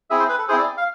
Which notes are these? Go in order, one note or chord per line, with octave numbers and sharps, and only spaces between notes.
C4 E4 G#4 E5
C5
B4
A4
C4 E4 G#4 C5
D5
F5